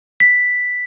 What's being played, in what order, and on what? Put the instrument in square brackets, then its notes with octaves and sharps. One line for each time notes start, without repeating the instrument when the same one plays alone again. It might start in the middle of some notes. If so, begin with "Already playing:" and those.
[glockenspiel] B6